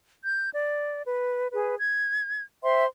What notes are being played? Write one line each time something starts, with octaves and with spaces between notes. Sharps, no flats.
G6
D5
B4
G#4 B4
G#6
C5 E5 G5 C6